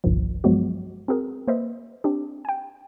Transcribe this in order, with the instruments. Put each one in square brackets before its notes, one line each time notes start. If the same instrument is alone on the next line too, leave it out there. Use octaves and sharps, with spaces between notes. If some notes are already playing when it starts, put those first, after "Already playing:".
[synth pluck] G1 C2 G2 A#2 D#3 F3
G2 F3 F#3 G#3 B3 F#4
C4 F#4 G#4 A#4
A#3 B4 C5 D#5 E5
C4 D4 G4
G5 G#5